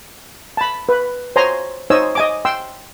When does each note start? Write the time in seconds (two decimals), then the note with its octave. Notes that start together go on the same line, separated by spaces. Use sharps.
0.57 A5 B5
0.89 B4
1.36 C5 C#5 G#5 A#5 C6
1.90 D#4 C5 C#5 D#5 G#5 E6
2.15 D#5 G#5 D6
2.45 G5 C6 E6